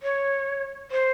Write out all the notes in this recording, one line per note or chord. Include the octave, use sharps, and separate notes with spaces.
C#5
C5